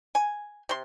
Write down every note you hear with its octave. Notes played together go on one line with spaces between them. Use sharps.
G#5
C3 C6